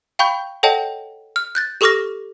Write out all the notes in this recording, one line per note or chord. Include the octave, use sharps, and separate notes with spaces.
F5 G5 B5 C#6 G6
A4 C#5 D#5 F#5 G5 A5
F6
F#6 G6 A6
G4 A4 C#6 D6 F6 A#6